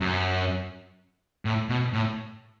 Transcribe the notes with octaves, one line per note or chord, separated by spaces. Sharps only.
F#2
A2
B2
A2